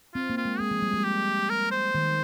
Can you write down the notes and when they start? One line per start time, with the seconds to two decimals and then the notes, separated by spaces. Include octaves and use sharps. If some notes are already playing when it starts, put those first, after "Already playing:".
0.14 C4 F4
0.30 A#3
0.38 F4
0.45 G#3
0.60 G#3 G#4
0.71 F3
0.82 G3
0.93 G#3
1.04 G4
1.49 A#4
1.71 C5
1.95 D#3